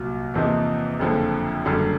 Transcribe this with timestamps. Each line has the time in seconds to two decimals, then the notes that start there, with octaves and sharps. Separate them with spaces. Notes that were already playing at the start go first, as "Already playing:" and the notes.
Already playing: C2 A#2 F#3
0.34 E2 C3 F3 A#3 D#4
0.99 F#1 F2 D3 F3
1.65 F#1 F#2 D3 G3